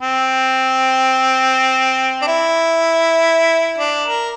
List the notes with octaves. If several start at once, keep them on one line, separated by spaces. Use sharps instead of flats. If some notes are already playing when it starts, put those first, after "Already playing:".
C4
D4
E4
D4
A#4